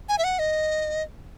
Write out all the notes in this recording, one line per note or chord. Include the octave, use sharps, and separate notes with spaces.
G#5
E5
F#5
D#5